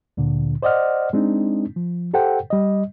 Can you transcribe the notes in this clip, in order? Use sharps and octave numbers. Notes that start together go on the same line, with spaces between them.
D2 A#2 D3
C5 D5 D#5 F#5 F6
G#3 C4 D4 D#4
F3
G4 A4 C5 F#5 G5
G3 D#5